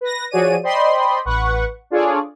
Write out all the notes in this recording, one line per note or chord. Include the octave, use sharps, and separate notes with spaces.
B4 A#6
F3 F#4 G#4 C#5 D5 D#7
C5 D5 D#5 G5 B5 C6
A1 B4 F#5 C#6
D4 F4 G#4 A4 C#5 D5